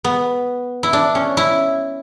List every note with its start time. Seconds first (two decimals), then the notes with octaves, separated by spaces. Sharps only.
0.04 B3
0.83 E4
0.93 D4
1.15 C#4
1.37 E4